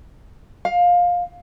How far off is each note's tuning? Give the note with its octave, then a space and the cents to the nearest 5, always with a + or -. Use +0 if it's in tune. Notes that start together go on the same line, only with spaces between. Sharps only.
F5 +15